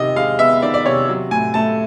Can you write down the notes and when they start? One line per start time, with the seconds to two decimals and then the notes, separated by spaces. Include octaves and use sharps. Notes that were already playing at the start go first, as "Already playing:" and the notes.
Already playing: C3 D#3 D#5
0.16 G#3 F5
0.39 B3 E5
0.62 D#3 D5
0.74 D5
0.85 C3 C#5
1.09 F#3
1.31 A2 G#5
1.54 A3 A5